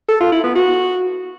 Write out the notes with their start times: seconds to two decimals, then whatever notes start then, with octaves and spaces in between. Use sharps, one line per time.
0.09 A4
0.20 F4
0.32 E4
0.44 B3
0.56 F#4